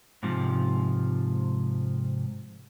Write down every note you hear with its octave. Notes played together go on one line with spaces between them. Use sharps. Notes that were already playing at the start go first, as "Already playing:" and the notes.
G#2 C3 F3